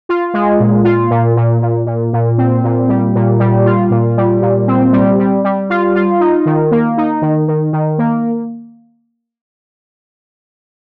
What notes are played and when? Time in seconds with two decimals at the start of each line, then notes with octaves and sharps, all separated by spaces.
0.09 F4
0.34 G#3
0.60 A#2
0.84 F4
1.10 A#2
1.37 A#2
1.62 A#2
1.86 A#2
2.13 A#2
2.38 C4
2.64 A#2
2.89 G3
3.15 A#2
3.40 G3
3.65 F4
3.90 A#2
4.17 G3
4.42 A#2
4.67 C4
4.92 G3
5.19 G3
5.44 G3
5.70 F4
5.95 F4
6.20 D#4
6.46 D#3
6.71 A#3
6.97 D#4
7.22 D#3
7.48 D#3
7.73 D#3
7.98 A#3